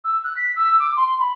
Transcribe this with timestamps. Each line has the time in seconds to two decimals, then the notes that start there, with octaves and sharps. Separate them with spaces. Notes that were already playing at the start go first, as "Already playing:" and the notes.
0.04 E6
0.24 F#6
0.37 B6
0.56 E6
0.80 D6
0.97 C6
1.20 B5